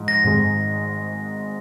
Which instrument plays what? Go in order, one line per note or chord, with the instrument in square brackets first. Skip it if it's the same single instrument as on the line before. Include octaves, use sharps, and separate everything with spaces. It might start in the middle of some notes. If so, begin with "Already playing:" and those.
Already playing: [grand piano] G#2 F3
[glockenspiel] A#6
[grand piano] G#1 G#2 D#3 G#3